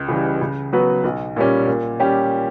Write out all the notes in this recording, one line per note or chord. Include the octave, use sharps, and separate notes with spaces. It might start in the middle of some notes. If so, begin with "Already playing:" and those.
Already playing: C#2
C#3 E3 G3
C#3
F#3 B3 F#4 B4
B1
A#2 G3 C#4
A#2
G3 C#4 G4